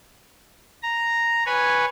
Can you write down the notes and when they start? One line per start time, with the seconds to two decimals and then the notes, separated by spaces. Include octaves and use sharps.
0.83 A#5
1.46 B4 C#5 G#5